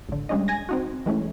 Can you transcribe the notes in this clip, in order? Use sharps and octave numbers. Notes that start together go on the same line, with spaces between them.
A1 D3
G3 G#3 C#4 D4 D#5
G#5 G#6 A#6
C4 D#4 F#4
E3 G#3 A3 C#4